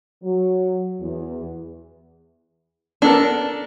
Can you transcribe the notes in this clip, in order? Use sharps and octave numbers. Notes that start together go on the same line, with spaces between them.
F#3
E2
B3 D4 A4 A#4